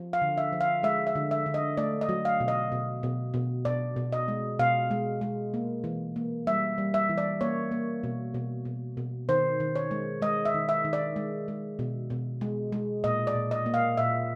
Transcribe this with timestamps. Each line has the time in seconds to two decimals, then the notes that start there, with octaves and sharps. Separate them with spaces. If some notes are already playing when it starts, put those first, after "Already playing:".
Already playing: F3
0.13 F5
0.22 D3
0.38 E5
0.53 F3
0.61 F5
0.83 G#3 E5
1.07 E5
1.15 D3
1.31 E5
1.46 D3
1.54 D#5
1.77 A3 D5
2.01 D#5
2.09 F#3
2.25 F5
2.40 B2
2.48 D#5
2.72 B2
3.03 B2
3.34 B2
3.65 B2 D5
3.96 B2
4.13 D#5
4.28 G#3
4.59 B2 F5
4.91 G#3
5.21 G#3
5.54 A#3
5.84 E3
6.16 A#3
6.47 G3 E5
6.78 G3
6.94 E5
7.09 E3
7.18 D5
7.41 A#3 C#5
7.72 A#3
8.03 B2
8.34 B2
8.65 B2
8.97 B2
9.29 D#3 C5
9.60 D#3
9.76 C#5
9.91 G#3
10.22 G#3 D#5
10.45 E5
10.54 D#3
10.69 E5
10.85 D#3
10.93 D5
11.16 G#3
11.48 G#3
11.79 B2
12.10 B2
12.41 G#3
12.72 G#3
13.04 A#2 D#5
13.27 D5
13.35 A#2
13.51 D#5
13.66 A#3
13.74 F5
13.98 A#2 E5